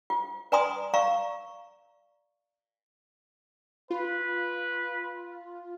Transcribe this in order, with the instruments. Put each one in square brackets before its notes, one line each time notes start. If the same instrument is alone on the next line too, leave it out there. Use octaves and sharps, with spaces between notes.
[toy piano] F4
B4 D5 G#5 A#5 C6 D#6
D5 F5 A#5 C#6
[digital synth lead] F4 [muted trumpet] B4